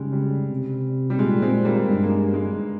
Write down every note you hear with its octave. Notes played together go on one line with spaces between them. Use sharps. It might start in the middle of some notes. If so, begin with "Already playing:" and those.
Already playing: C#3 G3 G#3
G3
C3
G3
A#2 G#3
G#3 C4
G3 A#3
G2 G#3
A#3
G#3
G#3